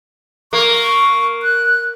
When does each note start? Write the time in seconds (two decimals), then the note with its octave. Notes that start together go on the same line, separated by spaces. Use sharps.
0.53 A#3 C#6
1.42 F#6